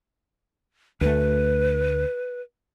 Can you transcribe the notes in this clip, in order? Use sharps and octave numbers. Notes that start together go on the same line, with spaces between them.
D2 A3 B4